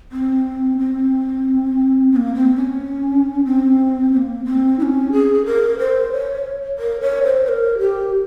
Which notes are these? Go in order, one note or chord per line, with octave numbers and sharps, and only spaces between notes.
C4
C4
C4
A#3
C4
C#4
C4
C4
A#3
C4
E4
C#4
G#4
A#4
C5
C#5
A#4
C#5
C5
C5
A#4
G4